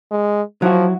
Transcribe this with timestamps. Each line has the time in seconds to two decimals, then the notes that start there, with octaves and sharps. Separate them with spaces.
0.11 G#3
0.62 F3 F#3 E4 F#4